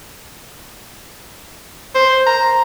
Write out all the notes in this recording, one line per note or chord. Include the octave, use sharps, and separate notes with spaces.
C5
A#5